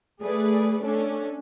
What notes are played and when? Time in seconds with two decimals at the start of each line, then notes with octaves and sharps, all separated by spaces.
0.21 A3 G#4 A4 B4 D5
0.83 A3 C#4 D4 A4